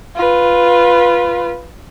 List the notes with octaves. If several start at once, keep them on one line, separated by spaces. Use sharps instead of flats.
F4 B4